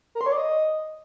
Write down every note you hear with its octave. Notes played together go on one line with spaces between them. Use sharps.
A#4
C6
C#5
D5
D#5